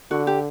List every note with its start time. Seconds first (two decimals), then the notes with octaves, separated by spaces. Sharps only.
0.11 D3 F#4
0.27 G4